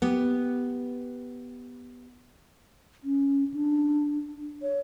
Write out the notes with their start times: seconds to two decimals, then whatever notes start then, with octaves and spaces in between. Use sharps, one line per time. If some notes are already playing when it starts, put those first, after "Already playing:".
0.02 B3 G4
3.04 C#4
3.54 D4
4.62 C#5